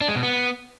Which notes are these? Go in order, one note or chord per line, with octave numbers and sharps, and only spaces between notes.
D4
G#3
B2
B3